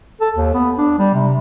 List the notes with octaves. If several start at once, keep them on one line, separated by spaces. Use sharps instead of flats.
A4
D#2
B3
D4
G3
C3